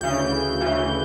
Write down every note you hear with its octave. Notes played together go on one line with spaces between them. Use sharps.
D2 C#3 E3 G6
D2 C#3 E3